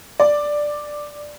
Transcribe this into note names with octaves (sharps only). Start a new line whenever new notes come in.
D5